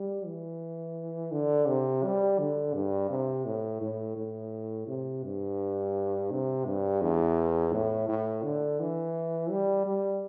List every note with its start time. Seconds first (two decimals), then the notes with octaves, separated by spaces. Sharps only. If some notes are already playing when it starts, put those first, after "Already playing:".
Already playing: G3
0.26 E3
1.32 D3
1.67 C3
2.04 G3
2.39 D3
2.74 G2
3.10 C3
3.45 A2
3.81 A2
4.17 A2
4.87 C3
5.23 G2
6.31 C3
6.66 G2
7.02 E2
7.72 A2
8.09 A2
8.43 D3
8.80 E3
9.51 G3
9.86 G3